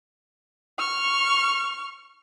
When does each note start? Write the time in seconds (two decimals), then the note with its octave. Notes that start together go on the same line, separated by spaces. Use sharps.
0.79 C#6 F6